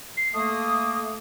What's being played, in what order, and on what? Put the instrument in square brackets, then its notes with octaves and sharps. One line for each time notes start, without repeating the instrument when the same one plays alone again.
[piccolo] C7
[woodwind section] A3 A#3 [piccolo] D#6